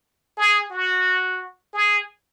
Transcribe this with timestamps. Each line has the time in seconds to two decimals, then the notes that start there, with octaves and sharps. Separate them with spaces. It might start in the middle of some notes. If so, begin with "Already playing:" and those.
0.37 G#4
0.71 F#4
1.73 G#4